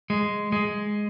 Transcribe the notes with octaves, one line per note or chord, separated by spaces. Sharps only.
G#3
G#3